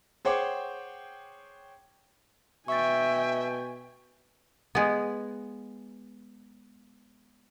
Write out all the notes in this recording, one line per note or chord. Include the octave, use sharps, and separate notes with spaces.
G#4 C5 C#5 F#5 G5 D6
B2 E5 G5 G#5 C#6 A6
G#3 B3